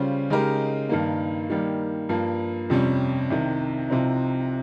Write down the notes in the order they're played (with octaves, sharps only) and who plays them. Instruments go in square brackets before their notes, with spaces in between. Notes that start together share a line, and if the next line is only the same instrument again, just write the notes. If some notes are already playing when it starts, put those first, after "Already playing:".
Already playing: [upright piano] C#3 G3 C#4 F4 C5
C#3 G#3 D#4 G4 A#4
G2 D#3 A#3
D#3 G3 A#3
G2 F3 A#3
F2 C3 G3 C#4
C2 C3 D#3
C2 C3 F3 C4 D#4